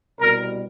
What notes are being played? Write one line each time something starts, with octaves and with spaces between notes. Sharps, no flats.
C2 B2 G3 A#4